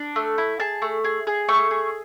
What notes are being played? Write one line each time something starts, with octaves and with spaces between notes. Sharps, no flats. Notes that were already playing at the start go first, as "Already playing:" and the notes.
Already playing: D4
A3
E4
G#4 A5
A3
G#4
G#4
A3 C#6
G#4